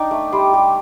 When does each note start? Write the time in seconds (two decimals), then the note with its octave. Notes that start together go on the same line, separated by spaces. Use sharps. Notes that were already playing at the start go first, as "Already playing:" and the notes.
Already playing: D4 D#4 G5
0.11 A3
0.32 G3 C6
0.53 G3